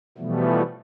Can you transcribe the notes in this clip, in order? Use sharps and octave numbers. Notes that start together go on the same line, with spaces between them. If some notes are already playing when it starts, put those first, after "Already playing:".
B2 E3 F3 G3 A3 B3